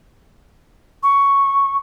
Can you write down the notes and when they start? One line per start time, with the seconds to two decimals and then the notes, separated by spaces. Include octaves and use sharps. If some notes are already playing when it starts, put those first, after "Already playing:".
1.03 C#6